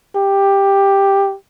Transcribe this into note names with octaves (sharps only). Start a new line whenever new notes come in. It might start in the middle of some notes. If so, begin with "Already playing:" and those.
G4